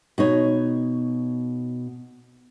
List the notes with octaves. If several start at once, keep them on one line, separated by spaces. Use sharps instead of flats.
B2 D#4 C#5